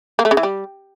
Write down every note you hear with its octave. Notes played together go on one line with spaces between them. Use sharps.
A#3
A3
C#3
E3
G3